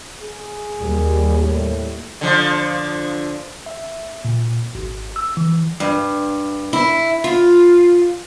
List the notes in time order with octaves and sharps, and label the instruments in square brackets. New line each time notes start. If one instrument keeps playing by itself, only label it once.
[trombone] G#4
[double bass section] D#2 G3
[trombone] A2
[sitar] D3 F3
[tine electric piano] E5
A#2
G#1
E6
E3
[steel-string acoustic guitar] G2
E4
F4